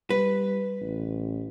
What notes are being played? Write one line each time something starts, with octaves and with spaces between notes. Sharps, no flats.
G3 B4
A1